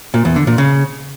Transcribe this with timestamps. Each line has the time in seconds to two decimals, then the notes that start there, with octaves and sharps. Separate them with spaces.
0.14 A#2
0.25 E2
0.36 D3
0.47 A#2
0.58 C#3